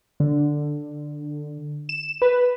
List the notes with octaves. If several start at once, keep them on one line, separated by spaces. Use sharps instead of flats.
D3
E7
B4